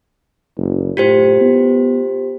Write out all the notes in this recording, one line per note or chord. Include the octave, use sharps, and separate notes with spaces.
F#1
A2 F4 G4 C5
B3